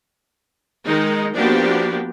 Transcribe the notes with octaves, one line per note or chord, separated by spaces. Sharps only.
D#3 G#3 D#4
F3 A#3 B3 D4 F#4 G4